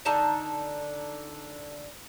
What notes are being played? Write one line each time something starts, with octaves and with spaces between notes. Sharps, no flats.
D3 D#4 A5 A#5